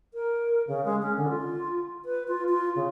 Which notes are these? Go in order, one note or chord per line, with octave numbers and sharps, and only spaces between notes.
A#4
C#3
G#3
C#4
D3
F4
B4
F4
F4
C#3